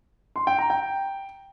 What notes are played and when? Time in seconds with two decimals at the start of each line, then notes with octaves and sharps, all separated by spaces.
0.36 C6
0.47 G5
0.58 A#5
0.70 G5